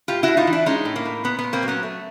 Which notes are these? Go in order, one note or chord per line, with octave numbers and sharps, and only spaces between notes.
A2 F4 G4
A2 E4 F#4
D#4 F4
E3
D4 E4
G#3 C#4 D#4
A2
A#3
A2
A#2 B3
B3
A#2
A#3 C4
F#3
B3 C#4
A3